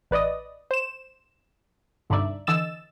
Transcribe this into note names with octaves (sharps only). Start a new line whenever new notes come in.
A1 B4 D5 D#5 D#6
C5 E7
C2 G2 D3 D#4 D5 E5
D3 E3 D#5 E6 A6 E7